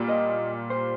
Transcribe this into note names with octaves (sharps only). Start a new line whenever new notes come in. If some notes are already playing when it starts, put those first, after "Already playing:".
Already playing: A#2 G3
D#5
C5